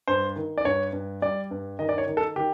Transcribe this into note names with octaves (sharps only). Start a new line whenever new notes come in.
G2 C5
D#3
D5
G2 C#5
G2
G3 D5
G2
D#3 D#5
D5
C#5
D#3
A4
D#3 G4